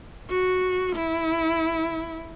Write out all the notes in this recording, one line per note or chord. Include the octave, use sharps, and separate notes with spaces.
F#4
E4